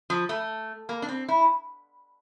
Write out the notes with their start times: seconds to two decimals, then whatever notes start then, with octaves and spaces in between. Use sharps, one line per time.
0.10 F3
0.29 A3
0.89 A#3
1.02 D4
1.09 C4
1.28 E4